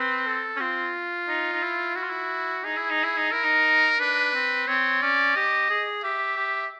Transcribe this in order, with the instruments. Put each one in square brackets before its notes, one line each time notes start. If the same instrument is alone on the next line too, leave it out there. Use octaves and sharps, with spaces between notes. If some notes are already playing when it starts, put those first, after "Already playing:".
Already playing: [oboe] C4 [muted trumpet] B4
[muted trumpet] A4
[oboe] C#4
[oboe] C4 [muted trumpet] F4
[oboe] D#4
D#4
E4
[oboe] E4 [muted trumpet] F#4
[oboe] F4
E4
[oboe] D#4 [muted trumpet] G#4
[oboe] E4
D#4
E4
D#4
[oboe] E4 [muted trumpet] A#4
[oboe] D#4
[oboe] D4 [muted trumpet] B4
[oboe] C4
[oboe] C4 [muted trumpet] C#5
[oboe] C#4 [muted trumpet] D5
[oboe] G4 [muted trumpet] D#5
[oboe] G#4
[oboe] G4 [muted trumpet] E5
[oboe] G4